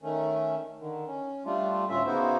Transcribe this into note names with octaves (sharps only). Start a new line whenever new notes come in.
D#3 A3 C#4
D3 D#3
C#4
G3 A3 D4 F4
D2 A2 A3 C#4 F4 E5
C#3 B3 D#4 E4 F#4 C5